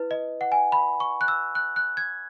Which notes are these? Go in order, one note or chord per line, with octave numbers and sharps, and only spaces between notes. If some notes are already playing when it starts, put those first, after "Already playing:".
Already playing: E4 B4
D#5
F#5
G#5
B5
C#6
F#6
E6
F#6
F#6
G#6